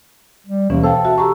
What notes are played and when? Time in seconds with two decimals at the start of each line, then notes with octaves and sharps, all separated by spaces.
0.47 G3
0.70 D#2 B2 E3 C#4
0.83 A4 C5 F5 G5
1.05 F#4 E5 G5
1.18 G4 A#5 C#6